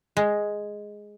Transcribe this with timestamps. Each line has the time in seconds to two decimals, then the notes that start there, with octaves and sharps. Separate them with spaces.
0.17 G#3